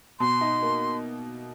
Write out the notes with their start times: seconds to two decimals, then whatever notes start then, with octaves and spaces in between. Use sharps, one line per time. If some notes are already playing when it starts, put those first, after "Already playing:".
0.20 B2 C6
0.41 D#4
0.62 A#3